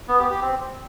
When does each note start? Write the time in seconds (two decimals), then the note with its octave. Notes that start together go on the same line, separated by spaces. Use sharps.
0.08 B3
0.19 G4
0.31 G4
0.42 C4